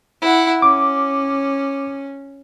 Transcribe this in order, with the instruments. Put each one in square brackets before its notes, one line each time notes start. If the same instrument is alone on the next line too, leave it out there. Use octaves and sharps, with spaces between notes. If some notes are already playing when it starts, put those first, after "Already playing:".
[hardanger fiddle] E4 F#5
[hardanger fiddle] C#4 [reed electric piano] D6